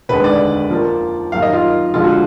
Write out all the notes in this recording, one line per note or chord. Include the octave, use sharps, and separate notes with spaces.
F1 D#2 D3 G#3 B4
D5
F2 F3 A#3
F#2 D#3 A#3 F5
D#5
F4
F1 F2 D3 G#3 F4
F#4